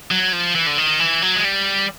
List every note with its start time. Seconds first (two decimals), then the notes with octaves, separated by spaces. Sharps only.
0.11 F#3
0.33 F3
0.55 E3
0.67 D3
0.78 D#3
1.00 E3
1.22 F#3
1.36 G#3
1.44 G3